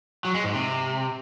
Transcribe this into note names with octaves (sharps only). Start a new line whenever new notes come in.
F#3
G#3
G#2
C3